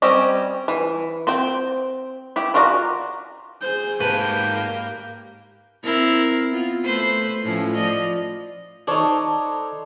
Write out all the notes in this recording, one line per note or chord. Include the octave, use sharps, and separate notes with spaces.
G3 C4 C#4 G4 D#5
E3
C4 C5 G5
E4 G4
D#3 F4 F#4 D5 A#5
G#4 C5 G6
G#2 A#3 G4 B4 A5
C4 E4 A#4
B3 F4
A3 B4 C5
A2 F3 C#4
F3 D5 D#5
D4 D#4 A4 C5 C#5